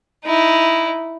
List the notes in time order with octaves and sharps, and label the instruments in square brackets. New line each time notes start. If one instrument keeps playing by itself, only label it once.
[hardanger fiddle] D#4 E4